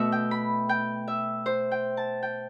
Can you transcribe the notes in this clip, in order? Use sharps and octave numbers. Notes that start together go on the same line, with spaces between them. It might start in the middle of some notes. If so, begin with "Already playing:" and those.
Already playing: B2 A3 E5
G5
B5
G5
E5
C5
G5
A5
G5